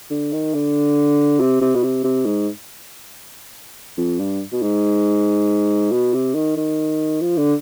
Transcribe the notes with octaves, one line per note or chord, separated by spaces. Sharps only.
D3
D#3
D3
C3
C3
B2
C3
C3
G#2
F2
G2
B2
G#2
B2
C3
D#3
D#3
F3
D3